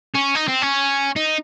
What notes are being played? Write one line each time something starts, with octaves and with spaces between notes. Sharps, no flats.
C#4
D#4
C4
C#4
D#4